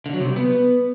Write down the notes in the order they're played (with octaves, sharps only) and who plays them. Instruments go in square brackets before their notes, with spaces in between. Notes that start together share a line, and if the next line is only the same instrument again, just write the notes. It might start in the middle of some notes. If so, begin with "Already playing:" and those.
[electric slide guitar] D3
F#3
C3
G3
B3